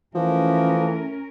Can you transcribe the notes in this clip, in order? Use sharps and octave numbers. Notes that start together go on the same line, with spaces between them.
E3 F3 A3 C#4 E4 A#4